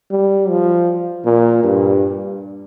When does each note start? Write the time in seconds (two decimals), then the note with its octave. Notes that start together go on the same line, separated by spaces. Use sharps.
0.11 G3
0.49 F3
1.25 A#2
1.63 G2